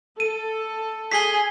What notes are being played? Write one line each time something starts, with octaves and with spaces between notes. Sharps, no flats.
A4 D#7
G#4 G#5 B6 C7 G7